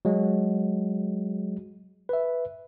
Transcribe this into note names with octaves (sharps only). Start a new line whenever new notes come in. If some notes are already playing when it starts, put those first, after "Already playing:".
F#3 G#3
B4 E5